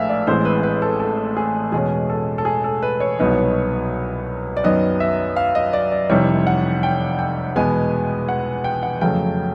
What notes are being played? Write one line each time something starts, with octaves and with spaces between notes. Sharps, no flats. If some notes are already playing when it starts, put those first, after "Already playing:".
Already playing: A#1 A2 G#3 B3 E5 F5
D5
A1 A2 E3 G#3 C4 C5
B4
B4
A4
A4
G#4
E2 B2 G#3 C#4 G#4
A4
A4
G#4
A4
B4
C#5
C2 B2 F#3 B3 D#4
D5
F#2 D#3 F#3 B3 D#5
E5
F5
D#5
D5
D5
F1 F2 C3 E3 G3 C#5
F#5
G5
G5
E2 B2 G#3 B3 G#5
F#5
G5
F#5
F2 C#3 F#3 A3 G5